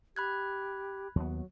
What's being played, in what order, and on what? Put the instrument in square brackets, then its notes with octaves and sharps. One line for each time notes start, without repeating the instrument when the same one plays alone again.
[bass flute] G4 [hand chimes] B5 F#6 G#6
[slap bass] D#2 B3 [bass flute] F#3